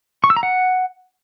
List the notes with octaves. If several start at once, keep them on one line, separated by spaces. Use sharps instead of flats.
C#6
E6
A#5
F#5